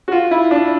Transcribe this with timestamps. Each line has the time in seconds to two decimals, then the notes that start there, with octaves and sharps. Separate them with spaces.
0.08 F#4
0.12 F4
0.31 E4
0.51 D4